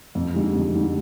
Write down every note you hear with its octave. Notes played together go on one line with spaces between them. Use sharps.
F2
D3 G#3 D#4 G4
F2
D3 G#3 D#4 G4